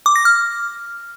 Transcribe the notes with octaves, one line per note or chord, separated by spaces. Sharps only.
D6
A#6
F6